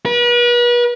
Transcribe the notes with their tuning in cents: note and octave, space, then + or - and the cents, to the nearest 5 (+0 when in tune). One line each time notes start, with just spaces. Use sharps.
B4 -40